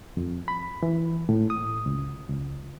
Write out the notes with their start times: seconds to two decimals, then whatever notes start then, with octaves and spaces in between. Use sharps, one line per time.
0.17 F2
0.48 B5
0.83 E3
1.29 A2
1.50 D#6
1.86 C#2
2.29 C#2